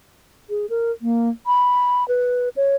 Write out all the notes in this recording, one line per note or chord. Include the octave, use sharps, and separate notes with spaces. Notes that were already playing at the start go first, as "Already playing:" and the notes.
G#4
A#4
A#3
B5
B4
C#5